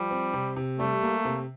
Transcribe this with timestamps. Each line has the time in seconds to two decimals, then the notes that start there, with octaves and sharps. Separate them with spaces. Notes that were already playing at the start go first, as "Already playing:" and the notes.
Already playing: F3 G3
0.11 C4
0.33 C3
0.56 C3
0.79 G3 A3
1.02 A#3
1.25 C3